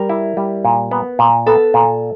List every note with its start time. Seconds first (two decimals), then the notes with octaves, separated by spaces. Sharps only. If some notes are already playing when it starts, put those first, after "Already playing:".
Already playing: G3 A#4
0.09 E4
0.37 G3
0.65 A#2
0.91 B3
1.19 A#2
1.46 B3 A4
1.74 A#2